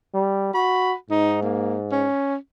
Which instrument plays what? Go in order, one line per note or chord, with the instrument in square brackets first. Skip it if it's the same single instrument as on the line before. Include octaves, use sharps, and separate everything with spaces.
[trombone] G3
[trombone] F#4 [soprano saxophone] B5
[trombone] G#2 [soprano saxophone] D#4
[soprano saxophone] A#3
C#4